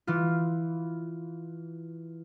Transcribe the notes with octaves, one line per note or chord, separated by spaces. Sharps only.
E3 F4